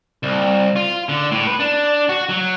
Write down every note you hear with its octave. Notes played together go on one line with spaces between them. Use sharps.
C2
F4
D3
A2
B4
D4
F#4
F#3